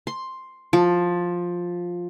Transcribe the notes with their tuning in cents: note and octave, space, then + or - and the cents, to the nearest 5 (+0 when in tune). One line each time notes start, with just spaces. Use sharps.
C6 +5
F3 +10